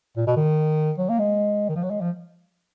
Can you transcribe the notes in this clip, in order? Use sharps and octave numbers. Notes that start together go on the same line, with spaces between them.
A#2
B2
D#3
F#3
A#3
G#3
D#3
F3
F#3
G#3
F3